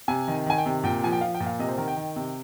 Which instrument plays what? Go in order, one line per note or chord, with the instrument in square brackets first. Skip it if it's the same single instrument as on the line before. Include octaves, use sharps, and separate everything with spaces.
[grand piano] C3 G#5
D#3
D#3 G#5
G5
C3
A#2 G5
F3 G#5
G5
F3 F5
G5
A#2
F5
C3 D#5
C5
D#3 A#4
G5
D#3
C3